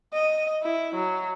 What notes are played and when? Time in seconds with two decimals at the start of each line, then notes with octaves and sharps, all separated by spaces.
0.14 D#5
0.63 E4
0.95 F#3